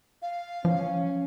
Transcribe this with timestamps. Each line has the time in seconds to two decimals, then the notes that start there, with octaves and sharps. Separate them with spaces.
0.22 F5
0.65 F3 C#4